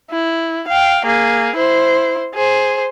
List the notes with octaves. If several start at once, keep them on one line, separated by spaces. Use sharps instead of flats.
E4
F5 G5
A#3 G#4
E4 C5
G#4 C5